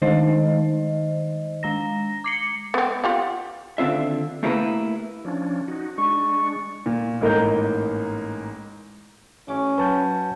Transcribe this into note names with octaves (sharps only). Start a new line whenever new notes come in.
D#3 G#3 D#4 C5 D#5
G#3 A#5 A#6
D6 C7 C#7
B3 C4
F4 G4 F#5
D#2 D3 C4 F4 E5
A3 A#3 E4 G4 A#4 B4
F3 C#4 D4
D#4 F#4
G#3 D4 C#6
A#2
A1 G#2 A#3 D#5 A#5 G6
A1 C#4 D6
F#3 B4 A5 G6